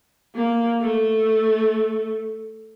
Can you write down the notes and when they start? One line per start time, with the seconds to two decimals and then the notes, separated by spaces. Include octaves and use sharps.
0.35 A#3
0.81 A3